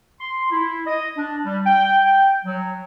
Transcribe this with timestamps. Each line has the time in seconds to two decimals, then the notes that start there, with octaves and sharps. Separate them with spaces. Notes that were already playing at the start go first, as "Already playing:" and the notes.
0.19 C6
0.51 E4
0.86 D#5
1.18 D4
1.45 G3
1.66 G5
2.06 G5
2.45 F#3